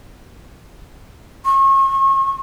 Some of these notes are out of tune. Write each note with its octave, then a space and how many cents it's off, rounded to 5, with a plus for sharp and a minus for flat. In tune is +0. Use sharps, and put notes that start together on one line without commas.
C#6 -35